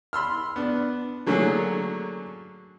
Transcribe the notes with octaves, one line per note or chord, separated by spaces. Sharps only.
B5 C6 E6 F6
B3 D4
D3 F#3 A3 A#3 C#4 G#4